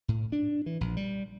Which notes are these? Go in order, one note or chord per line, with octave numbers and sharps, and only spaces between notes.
A2
D4
E3
A#1
G3